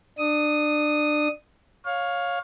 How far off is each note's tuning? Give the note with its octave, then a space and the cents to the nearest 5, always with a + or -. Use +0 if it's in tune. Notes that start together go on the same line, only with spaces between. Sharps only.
D4 +25 D#6 +0
C#5 +0 F5 +15